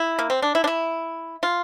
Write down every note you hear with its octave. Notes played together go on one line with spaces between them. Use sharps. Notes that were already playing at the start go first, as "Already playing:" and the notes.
Already playing: E4
A#3
C4
D4
E4
D4
E4
F4